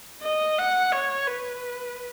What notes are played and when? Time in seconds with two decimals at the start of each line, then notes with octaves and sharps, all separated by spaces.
0.23 D#5
0.58 F#5
0.92 C#5
1.27 B4